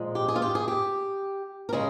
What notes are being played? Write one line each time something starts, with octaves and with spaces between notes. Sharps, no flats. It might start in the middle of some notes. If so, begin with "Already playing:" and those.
Already playing: A#2 F3 G#3
G4
G#4
F4
G4
G#4
G4
A#4
C#3 G#3 G#4